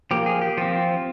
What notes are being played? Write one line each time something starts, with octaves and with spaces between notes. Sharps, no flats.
F3 A#3 G4
G#4
G4
F3 C4 F4